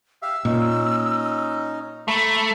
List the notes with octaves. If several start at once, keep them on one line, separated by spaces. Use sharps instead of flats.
G4 E5 F5 E6
A#2 C#4 D#4 D#5
A3 E5 A#5 B5 D6